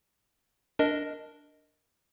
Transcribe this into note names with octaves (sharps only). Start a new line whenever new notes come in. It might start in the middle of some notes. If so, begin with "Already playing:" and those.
D4 A#4 D#5